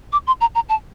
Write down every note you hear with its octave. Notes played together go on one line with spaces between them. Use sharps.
D6
C6
A#5
A#5
A5